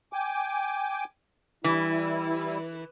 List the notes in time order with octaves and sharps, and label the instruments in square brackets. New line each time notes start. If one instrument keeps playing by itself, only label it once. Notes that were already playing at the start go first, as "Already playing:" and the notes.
[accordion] G5 G#5 D6
[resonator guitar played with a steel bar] E3 [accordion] G3 E4